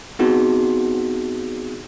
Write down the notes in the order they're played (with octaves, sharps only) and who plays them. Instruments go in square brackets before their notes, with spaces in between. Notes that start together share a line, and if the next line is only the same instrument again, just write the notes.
[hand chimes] B3 C4 D#4 F#4 G#4